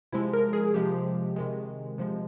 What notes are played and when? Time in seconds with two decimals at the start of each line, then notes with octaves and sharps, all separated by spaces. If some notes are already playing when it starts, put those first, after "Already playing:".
0.12 C3 F3 G#3 E4
0.33 A#4
0.53 G#4
0.74 C3 F3 G#3 G4
1.36 C3 D#3 G#3
1.98 C3 F3 G#3